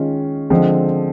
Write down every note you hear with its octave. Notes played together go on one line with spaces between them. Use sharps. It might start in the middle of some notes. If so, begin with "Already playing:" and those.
Already playing: D#3 G#3 C#4 F4
D3 F3 G#3 C4